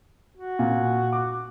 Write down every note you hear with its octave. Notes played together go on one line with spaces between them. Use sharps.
F#4
A#2
D6